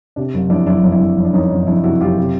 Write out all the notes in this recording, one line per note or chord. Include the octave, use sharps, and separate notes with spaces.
C3 D4
F#1
F2 D4 E4
F#1 D4 E4
F2
D4 E4
F2
F2
D4
F2 C#4 D#4
F#1 D4
F2 D4 E4
C3 E4 F#4
F#1 F4 G4
C3